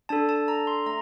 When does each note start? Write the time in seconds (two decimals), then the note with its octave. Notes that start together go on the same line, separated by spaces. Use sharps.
0.09 D4 A4 A5
0.29 A5
0.48 A#5
0.67 C6
0.86 A3 A#5